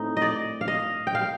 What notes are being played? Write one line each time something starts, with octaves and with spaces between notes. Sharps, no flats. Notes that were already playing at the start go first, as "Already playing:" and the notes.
Already playing: A2 C4 D#4
D#5
D5
F5
D#5
G5
F5